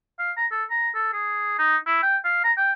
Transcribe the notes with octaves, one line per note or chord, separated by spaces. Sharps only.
F5
A#5
A4
A#5
A4
G#4
D#4
E4
G5
F5
A#5
G5